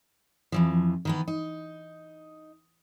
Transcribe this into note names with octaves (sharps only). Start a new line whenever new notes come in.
F2 E3 F3
D#3 E3 B3
D#4